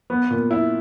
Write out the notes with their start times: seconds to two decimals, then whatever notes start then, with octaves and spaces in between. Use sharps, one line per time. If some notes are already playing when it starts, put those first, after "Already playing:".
0.10 B3
0.30 A#2
0.51 E4